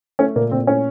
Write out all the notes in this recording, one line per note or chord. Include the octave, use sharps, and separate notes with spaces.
A3 C#4
A#2 A#3
A#2 C4
A3 C#4